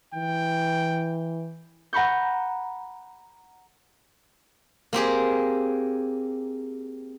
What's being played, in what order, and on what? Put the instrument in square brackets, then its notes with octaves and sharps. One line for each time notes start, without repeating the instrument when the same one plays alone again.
[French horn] E3 [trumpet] G5
[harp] F#5 A#5 B5 C#6 G6
[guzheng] A#3 C4 G4 G#4